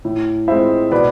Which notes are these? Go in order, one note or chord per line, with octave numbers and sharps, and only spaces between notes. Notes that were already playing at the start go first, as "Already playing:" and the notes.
A2
G#3 C4 E4 C5 E5
B2 B4 D5